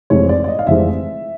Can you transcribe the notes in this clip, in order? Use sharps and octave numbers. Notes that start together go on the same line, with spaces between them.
F1 F2 C3 E3 G#3 C#5
D5
D5
D#5
F5
F1 F2 C3 E3 G#3 E5